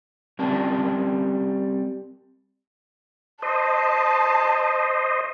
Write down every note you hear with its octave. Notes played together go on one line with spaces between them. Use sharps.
G3 C4 C#4 A#4 D5 A5
C5 D#5 A5